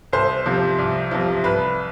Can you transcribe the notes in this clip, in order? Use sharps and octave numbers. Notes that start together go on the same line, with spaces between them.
C2 C5
C3 F3
C2
C3 F3
C2 B4